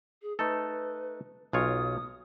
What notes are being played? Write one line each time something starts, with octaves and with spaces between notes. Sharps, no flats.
G#4
A3 D#4 A4 B4
B1 F4 C#5 D#6